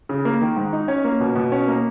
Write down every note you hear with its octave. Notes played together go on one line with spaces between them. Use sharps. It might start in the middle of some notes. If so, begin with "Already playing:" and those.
C#3
A#3
D#3
G#2
D#4
C#4 C#5
A#3
B2
B2
C#4
A#3